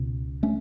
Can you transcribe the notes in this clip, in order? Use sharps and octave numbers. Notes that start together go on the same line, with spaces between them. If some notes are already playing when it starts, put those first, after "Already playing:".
Already playing: C#2 B2
A3 C#4